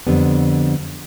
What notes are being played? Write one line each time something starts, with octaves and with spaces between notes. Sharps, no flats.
F2 D3 G3 B3